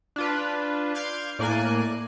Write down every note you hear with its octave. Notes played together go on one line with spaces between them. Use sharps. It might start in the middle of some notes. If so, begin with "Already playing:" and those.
D4 F4 B4
F5 C6 D6 F6 G6 G#6
A2 A#3 D5 G#5 F#6